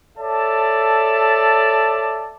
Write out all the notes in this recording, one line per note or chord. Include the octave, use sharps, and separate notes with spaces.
A4 C#5 D5 E5 A5